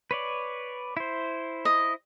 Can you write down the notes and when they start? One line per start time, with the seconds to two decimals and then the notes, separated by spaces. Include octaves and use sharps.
0.11 B4 C#5 D5
0.97 E4 C5
1.65 D#5